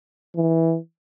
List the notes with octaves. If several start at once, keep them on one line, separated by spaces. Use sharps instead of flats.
E3